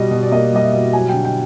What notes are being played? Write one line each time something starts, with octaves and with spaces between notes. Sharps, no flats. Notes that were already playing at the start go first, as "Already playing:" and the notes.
Already playing: B2 G3 D#5
B2
D5
A#3 D#5
G3 D#5
E5
B2
F#3 G#5
D3 G5
G5